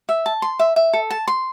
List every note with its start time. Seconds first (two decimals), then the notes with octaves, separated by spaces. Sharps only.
0.09 E5
0.26 A5
0.42 C6
0.59 E5
0.76 E5
0.93 A4
1.10 A5
1.28 C6